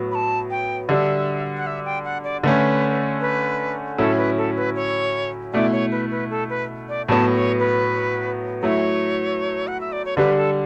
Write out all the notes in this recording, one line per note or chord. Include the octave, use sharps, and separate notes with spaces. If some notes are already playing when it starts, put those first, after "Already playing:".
Already playing: A2 F#3 B3
B5
A5
G5
D3 G3 D4 E5
F#5
E5
G5
F#5
D5
D3 A3 C#4 B4
B4
A2 F#3 C#4 E4 A4
B4
A4
B4
C#5
B2 A3 E4 D5
C#5
B4
B4
A4
B4
D5
A2 F#3 B3 A5
C#5
B4
F#3 A3 E4 C#5
F#5
E5
D5
C#5
D3 G3 D4 B4
A4